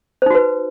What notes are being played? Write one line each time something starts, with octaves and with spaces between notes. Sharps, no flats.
D#4 F#4 B4 C5